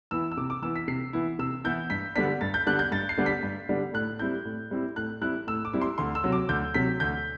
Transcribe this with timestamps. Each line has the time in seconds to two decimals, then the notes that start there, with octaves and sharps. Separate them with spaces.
0.11 E3 B3 E4 E6
0.32 E6
0.37 C3 D6
0.50 D6
0.62 E3 B3 E4 E6
0.76 B6
0.88 C3 C7
1.13 E3 B3 E4
1.39 C3 E6
1.64 E3 B3 E4 G6
1.90 G2 B6
2.16 D3 G3 B3 D4 B6
2.41 G2 A6
2.54 G6
2.66 D3 G3 B3 D4 F#6
2.79 G6
2.92 G2 A6
3.09 C7
3.17 D3 G3 B3 D4
3.26 B6
3.43 G2
3.69 D3 G3 B3 D4
3.94 A2 F#6
4.19 G3 C4 E4 G6
4.45 A2
4.71 G3 C4 E4
4.96 A2 F#6
5.22 G3 C4 E4 F#6
5.47 A2 E6
5.65 D6
5.73 G3 C4 E4
5.81 C6
5.98 D2 C6
6.15 E6
6.24 C3 F#3
6.32 D6
6.49 D2 G6
6.74 C3 F#3 B6
7.00 D2 G6